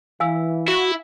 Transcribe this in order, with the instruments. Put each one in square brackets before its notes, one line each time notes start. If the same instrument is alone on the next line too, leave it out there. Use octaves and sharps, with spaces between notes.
[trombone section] E3 [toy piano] F5 G#5 E6
[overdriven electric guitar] E4 [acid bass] F#4